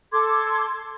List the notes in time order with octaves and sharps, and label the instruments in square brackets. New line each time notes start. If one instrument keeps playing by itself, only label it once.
[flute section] A4 C6 D6 G#6